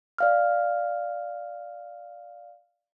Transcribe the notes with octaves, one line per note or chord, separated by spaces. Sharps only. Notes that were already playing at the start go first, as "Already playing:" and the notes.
D5 F5 F6